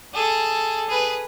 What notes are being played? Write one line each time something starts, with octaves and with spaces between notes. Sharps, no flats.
G#4 A4
G#4 B4